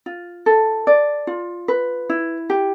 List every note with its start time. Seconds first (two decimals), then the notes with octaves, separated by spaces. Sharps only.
0.06 F4
0.46 A4
0.87 D5
1.27 F4
1.68 B4
2.10 E4
2.50 G4